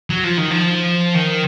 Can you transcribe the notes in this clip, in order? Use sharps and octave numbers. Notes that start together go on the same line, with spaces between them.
F#3
F3
D#3
F3
D#3